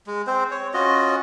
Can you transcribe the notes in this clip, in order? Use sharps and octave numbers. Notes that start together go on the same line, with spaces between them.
G#3
C4 C5
C#5
C#4 F4 F#4 D#5